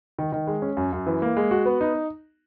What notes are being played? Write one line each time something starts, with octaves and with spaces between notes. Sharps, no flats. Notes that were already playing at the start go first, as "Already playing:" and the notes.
D#3
D#3
G#3
C#4
F#2
F#2
E3
A#3
G#3
F#4
B3
D#4